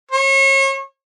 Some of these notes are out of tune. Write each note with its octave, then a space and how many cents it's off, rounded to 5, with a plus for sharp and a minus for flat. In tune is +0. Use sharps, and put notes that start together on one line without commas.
C#5 -35